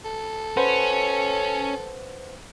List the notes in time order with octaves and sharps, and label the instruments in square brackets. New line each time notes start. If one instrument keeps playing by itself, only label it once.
[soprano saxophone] A4
[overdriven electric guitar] C#4 [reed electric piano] B4 C5 F#5